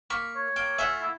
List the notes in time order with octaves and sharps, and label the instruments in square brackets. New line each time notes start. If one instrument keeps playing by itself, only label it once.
[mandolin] A#3 B5 [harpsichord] C#6
[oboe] C#5
[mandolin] A#3 [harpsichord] G5
[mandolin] A3 F4 F#5 [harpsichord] E5 G#5
[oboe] E4